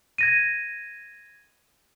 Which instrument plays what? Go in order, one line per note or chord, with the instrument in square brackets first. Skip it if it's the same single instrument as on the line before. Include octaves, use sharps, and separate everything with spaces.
[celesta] G#6 A#6 D#7